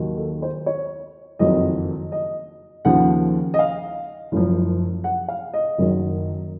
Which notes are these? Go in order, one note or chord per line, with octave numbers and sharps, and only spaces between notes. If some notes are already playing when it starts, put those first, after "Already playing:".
Already playing: D#2 D#3 F#3
A4
C5
C#5
F#1 F2 D#3 F#3 D#5
D#5
D#2 C#3 F3 F#5
D#5
F5
F#1 F#2 F3
F#5
F5
D#5
F#1 F#2 D#3 F#3